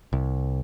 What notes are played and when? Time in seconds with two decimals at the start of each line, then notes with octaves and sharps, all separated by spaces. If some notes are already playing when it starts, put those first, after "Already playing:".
0.13 C2